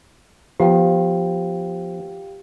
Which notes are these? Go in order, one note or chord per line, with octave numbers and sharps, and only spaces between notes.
F3 B3 G4 F5 G5